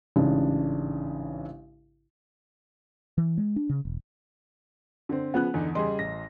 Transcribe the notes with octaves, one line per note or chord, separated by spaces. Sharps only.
A1 G#2 C#3 D4
E3
G#3
D4
C#3
E1
D3 C4
C#3 F3 B3 F#5 F#6
E2 D3 D#4
C#3 G3 G#4 D#5 C6
A1 A#6